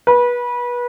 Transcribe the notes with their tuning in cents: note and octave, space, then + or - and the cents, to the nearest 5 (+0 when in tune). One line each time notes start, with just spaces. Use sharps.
B4 -25